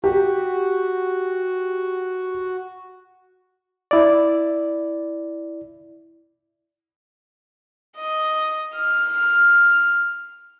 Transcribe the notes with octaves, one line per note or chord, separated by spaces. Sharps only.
F#4 G4
E4 D5
D#5
F6